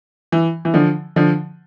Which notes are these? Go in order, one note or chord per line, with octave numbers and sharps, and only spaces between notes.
E3
E3
D3 F3
D3 F3